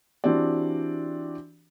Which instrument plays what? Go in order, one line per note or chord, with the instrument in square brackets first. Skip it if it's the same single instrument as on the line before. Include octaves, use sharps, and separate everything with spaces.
[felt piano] E3 C4 D4 F#4 G4 D5